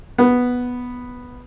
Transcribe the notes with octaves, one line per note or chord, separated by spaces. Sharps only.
B3